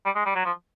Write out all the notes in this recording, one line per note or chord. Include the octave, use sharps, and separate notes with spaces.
G3
G#3
G3
F#3
F3